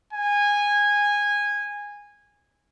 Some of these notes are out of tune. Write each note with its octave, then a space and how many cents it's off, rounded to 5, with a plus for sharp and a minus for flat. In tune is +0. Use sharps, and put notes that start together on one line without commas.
G#5 -15